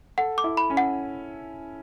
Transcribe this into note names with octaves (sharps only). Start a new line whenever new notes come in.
A4 F#5
D6
E4
B5
C#4
F#5